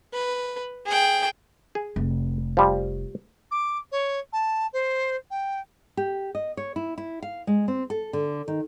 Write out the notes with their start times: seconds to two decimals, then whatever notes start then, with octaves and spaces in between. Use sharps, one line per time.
0.14 B4
0.86 G#4 G5
1.75 G#4
1.96 F1
2.57 F3 G3
3.51 D6
3.92 C#5
4.33 A5
4.73 C5
5.31 G5
5.97 G4
6.35 D#5
6.57 C#5
6.76 E4
6.98 E4
7.22 F5
7.47 G#3
7.68 C4
7.90 A4
8.13 D3
8.48 D#3